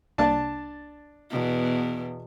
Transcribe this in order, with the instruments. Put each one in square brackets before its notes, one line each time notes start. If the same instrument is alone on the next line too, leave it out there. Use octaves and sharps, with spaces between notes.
[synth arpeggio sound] C2 A#3 [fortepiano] D4 A5
[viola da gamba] E2 B2